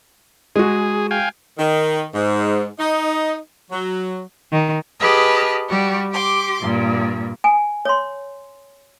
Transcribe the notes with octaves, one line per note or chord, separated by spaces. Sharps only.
G#3 F#4 G#4
F5 G5 G#5
D#3
G#2
D#4
F#3
D#3
G4 G#4 B4 D#5 A5 F6
G3 F#4 G4
G4 C6 D6
G2 A#2
G#5
C#5 C6